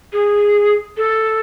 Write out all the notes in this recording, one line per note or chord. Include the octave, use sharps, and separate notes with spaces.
G#4
A4